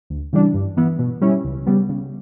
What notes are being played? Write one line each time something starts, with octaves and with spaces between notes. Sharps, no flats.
D2
C#3 E3 G3 D4
G2
E3 B3 E4
B2
G3 C#4 E4
C#2
C#3 G3 B3
C#3